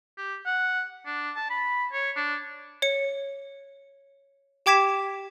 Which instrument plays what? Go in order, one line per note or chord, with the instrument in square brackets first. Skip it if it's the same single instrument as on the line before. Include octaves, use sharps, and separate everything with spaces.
[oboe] G4
F#5
D4
A5
B5
C#5
D4
[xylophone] C#5 C#7
G4 G5 D6 G#6 B6 E7